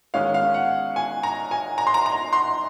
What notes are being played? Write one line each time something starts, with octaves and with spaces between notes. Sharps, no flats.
D#3 G#3 C#4 F5
F5
F#5
G#5
A#5
G#5
A#5
C6
A#5
A#5
C6